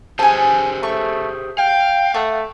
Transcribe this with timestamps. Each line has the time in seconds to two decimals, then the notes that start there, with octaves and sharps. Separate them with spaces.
0.19 G4 G#4 C5 G#5 A5
0.83 A3 C#6
1.58 F5 G5
2.14 A3 E5 F#5 D#6